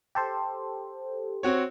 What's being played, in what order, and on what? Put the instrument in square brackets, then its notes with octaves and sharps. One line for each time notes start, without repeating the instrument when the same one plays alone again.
[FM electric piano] G4 A4 C5
[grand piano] C4 F#4 C#5